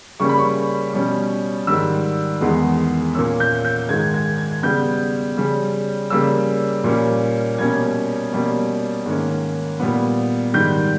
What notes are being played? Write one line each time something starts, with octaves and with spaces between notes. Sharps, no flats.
C#3 G3 A#3 C#4 C#6
B5
C#6
B2 G3 C#4
G#2 D#3 G3 E6
E2 D#3 G#3 B3
A#2 A#3 C#4 E6
G6
G6
G#2 D#3 G#3 G#6
G#6
G#6
C#3 G3 B3 G6
C#3 G3 C#4
C#3 G3 A#3 C#4 E6
A#2 G3 A#3 C#4
B2 G3 A#3 C#4 G#6
B2 G3 A#3 C#4
G#2 D#3 A#3 C#4
A#2 G3 B3
G#2 D#3 G3 G6